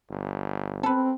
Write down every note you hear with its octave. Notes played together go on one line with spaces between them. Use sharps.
G1
C4 A4 B4